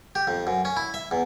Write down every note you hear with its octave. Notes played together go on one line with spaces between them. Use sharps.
G4
F2
F#2
C#4
E4
E5
E2